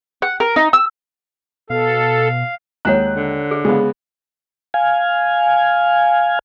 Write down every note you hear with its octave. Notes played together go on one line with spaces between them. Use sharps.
F#5
A#4
D#4
E6
B2 A4 F5
D#2 G#3 C#5 F#5 A#5 F#6
D3
G#4
C#3 G#3 B3 F5
F5 G#5